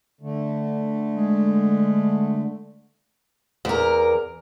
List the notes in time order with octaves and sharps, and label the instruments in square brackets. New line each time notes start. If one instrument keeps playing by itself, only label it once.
[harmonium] D3 A3
[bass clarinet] G#3
[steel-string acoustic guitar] E2 A#4